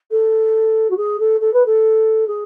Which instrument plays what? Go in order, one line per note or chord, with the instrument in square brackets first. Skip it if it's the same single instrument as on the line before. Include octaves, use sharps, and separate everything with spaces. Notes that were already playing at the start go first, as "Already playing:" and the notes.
[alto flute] A4
F#4
G#4
A4
A4
B4
A4
G#4